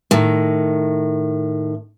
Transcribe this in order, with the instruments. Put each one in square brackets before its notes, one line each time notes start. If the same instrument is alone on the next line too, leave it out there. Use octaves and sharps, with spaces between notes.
[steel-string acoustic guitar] A2 D#3